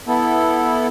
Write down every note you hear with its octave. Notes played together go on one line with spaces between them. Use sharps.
B3 E4 A4